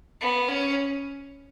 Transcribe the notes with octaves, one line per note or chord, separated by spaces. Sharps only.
B3
C#4